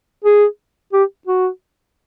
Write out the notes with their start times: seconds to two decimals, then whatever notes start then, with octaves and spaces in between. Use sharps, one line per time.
0.24 G#4
0.93 G4
1.28 F#4